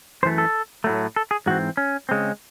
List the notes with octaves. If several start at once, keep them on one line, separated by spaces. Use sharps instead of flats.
F#2 E3 A3 C5
A4
A2 F#3 A3
A4
G#4
G#2 E3 C4 F#4
C#4
C#3 G#3 C4